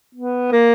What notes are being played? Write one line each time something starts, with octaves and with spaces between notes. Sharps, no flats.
B3
A#3